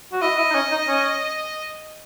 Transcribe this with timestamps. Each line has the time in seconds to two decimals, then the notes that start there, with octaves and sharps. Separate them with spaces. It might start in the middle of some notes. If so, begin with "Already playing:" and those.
0.13 F#4
0.22 E4 D#5
0.38 E4
0.50 D#4
0.55 C#4
0.71 D#4
0.88 C#4